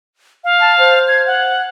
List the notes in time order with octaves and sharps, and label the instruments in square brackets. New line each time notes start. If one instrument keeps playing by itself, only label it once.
[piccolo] F5
[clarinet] A5
C5
[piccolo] G#6
F#5